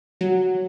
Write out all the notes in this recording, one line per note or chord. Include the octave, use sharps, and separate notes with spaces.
F#3